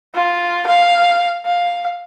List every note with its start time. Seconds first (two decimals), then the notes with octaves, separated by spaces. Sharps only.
0.14 F4
0.67 F5
1.45 F5